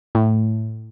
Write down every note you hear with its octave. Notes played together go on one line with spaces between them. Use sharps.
A2